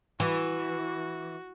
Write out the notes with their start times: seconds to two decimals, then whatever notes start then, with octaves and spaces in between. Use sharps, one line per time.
0.20 E3 F#4